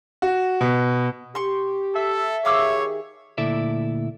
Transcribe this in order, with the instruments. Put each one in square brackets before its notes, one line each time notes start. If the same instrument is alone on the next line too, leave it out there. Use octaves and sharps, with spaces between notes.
[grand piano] F#4
B2
[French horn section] G4 [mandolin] C6 C#6
[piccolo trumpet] A4 [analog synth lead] E5
[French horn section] D#3 G4 G#4 [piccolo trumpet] C#5 [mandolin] F5 D6 E6
[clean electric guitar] D2 A#2 E4 A4 D5 E5